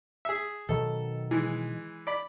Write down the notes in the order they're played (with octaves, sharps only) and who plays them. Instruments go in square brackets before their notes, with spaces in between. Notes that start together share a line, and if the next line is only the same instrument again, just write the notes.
[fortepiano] G#4 E5
[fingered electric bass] B2 D#3 F#3 [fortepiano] A4
[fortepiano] E3 G#3
D5 B5